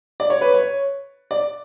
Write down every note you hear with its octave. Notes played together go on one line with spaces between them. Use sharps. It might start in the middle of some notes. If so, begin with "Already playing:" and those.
D5
C#5
B4
C#5
D5